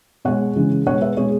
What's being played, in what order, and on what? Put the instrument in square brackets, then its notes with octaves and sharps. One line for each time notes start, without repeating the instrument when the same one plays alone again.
[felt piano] B2 G#3 C#5 F#5
C#3 E3 G#3
B2 G#3 C#5 F#5
B4 E5
B2 G#3 G#4 C#5